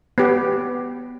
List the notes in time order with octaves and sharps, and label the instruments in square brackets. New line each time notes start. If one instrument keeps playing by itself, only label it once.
[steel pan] B3 G4